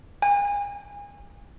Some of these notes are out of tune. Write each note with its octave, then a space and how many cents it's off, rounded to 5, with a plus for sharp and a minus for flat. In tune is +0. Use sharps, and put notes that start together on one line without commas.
G#5 -35